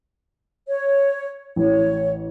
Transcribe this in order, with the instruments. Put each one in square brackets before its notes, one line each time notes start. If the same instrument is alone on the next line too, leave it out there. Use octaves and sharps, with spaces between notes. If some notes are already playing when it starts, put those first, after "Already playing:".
[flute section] C#5
[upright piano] A1 [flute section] C#5